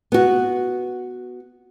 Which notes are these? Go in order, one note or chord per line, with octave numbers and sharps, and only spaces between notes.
B3 F#4